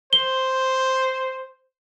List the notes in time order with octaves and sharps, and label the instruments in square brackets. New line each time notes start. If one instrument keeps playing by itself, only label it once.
[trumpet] C5 [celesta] G7